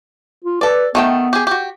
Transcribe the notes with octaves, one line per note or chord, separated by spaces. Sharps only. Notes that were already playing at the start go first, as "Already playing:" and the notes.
F4
A4 B4 D5
D#3 A3 B3 G5
G4 G#4
F#4 G4